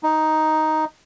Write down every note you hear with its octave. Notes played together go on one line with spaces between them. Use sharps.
D#4